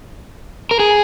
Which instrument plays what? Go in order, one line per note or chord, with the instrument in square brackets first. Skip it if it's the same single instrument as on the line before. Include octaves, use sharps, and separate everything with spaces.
[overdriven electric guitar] A#4
G#4